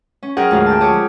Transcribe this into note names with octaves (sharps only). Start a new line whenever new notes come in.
C#4
F#2 G#4 A#4 F#5 G5 F#6
D2 G#2 F3 F#4 F5
G5 A5
G4 G#4 C#5 D6
F3